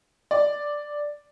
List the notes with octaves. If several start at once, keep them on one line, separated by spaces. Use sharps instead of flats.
D5